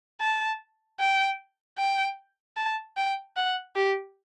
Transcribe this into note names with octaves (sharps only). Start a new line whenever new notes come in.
A5
G5
G5
A5
G5
F#5
G4